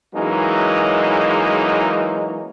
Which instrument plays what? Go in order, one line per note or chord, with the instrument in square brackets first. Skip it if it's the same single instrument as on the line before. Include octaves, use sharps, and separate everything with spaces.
[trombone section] E3 F#3 G#3 A#3 C#4 D#4